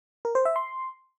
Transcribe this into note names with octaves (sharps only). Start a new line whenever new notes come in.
A#4
C5
E5
C6